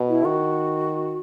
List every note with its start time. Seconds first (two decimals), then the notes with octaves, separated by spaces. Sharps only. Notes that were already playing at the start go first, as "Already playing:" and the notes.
Already playing: B2
0.09 E4
0.24 D#3 F#4